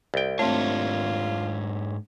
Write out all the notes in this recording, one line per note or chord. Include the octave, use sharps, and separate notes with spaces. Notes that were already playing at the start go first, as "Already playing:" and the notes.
C2 G5
G#2 A3 C4 D4 F4 C#5